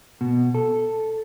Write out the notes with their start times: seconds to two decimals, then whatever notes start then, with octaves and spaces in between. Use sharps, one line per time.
0.21 B2
0.55 A4